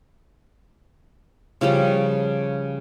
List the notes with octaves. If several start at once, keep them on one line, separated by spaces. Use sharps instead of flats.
C#3 F3 G3 C#4